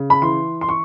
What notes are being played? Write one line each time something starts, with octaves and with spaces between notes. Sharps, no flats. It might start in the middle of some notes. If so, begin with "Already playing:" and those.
Already playing: C#3
B5
E3 C6
C6
C#6